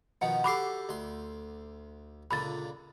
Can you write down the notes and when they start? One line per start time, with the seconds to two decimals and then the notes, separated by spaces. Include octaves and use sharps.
0.21 B2 D#3 F3 F#5
0.44 F#4 G4 A4 B5 D6 C7
0.89 D2 C6
2.31 C#2 A#2 D3 B5 A6